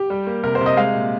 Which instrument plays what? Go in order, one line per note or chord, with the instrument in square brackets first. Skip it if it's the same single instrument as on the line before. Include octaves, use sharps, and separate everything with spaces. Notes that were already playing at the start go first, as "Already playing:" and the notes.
Already playing: [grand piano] G4
G3
A#3
C3 A#4
C5
C3
D#5
G#3 F5
A#2